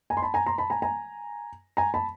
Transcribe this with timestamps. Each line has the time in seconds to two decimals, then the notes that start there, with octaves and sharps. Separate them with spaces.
0.10 G#5 A#5
0.17 C6
0.22 A5 B5
0.34 G#5 A#5
0.46 A#5 C6
0.58 A5 B5
0.70 G#5 A#5
0.82 G#5 A#5
1.77 G#5 A#5
1.94 A5 B5